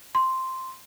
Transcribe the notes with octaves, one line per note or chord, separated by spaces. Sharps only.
C6